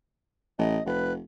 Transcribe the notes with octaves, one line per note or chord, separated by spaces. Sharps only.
A1 D#5
F1 B4